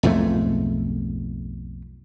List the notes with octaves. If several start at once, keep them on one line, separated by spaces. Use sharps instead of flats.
B1 F2 G#2 A3